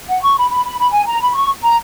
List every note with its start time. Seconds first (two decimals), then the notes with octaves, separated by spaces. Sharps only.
0.09 F#5
0.23 C#6
0.37 B5
0.51 B5
0.65 B5
0.79 B5
0.93 G#5
1.06 A#5
1.21 B5
1.35 C#6
1.63 A#5